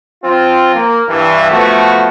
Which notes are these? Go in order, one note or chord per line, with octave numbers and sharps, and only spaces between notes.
F3 C4 F4
A#3
G2 E3
F3 A3 B3 F#4